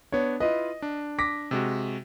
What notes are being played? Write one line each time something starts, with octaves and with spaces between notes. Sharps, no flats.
B3 D4 C#5
E4 F4 B4 D#5
D4
D6 A#6 B6
C3 G#3 F#4